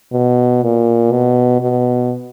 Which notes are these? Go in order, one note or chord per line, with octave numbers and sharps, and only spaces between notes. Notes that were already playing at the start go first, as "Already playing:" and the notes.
B2
A#2
B2
B2